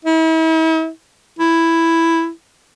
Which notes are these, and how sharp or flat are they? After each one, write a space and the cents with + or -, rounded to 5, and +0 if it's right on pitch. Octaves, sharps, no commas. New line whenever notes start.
E4 -40
E4 +0